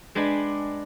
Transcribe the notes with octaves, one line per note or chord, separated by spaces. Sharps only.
G#3 D4 B4 G5 G#5 B5